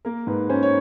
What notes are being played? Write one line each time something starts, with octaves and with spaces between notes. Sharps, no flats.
A#3 A#4
G#2 B4
C#4 C5
C#5